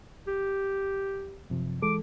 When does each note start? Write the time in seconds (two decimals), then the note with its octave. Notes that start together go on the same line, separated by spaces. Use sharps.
0.27 G4
1.50 F#2 C3 F3
1.82 E3 G#3 A4 D6